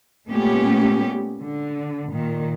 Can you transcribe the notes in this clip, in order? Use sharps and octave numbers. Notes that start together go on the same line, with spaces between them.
A#2 G#3 A3 B3 C#4 G4
D3
A#2 D#3